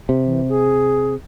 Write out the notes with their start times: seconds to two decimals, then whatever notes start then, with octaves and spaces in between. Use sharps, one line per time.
0.09 C3
0.26 E3
0.49 G#4